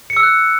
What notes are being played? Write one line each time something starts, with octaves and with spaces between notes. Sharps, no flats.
C#7
E6
F#6